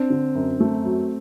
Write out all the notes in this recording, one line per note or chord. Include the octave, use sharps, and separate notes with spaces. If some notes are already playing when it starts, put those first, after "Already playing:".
Already playing: C4 D4
D3
F#2
A3
F#3